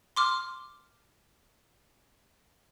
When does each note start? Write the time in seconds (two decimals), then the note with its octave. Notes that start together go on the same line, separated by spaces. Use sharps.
0.16 C6 D6 F6